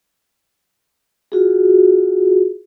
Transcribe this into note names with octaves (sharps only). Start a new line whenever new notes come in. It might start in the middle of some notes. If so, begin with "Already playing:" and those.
F4 F#4 G#4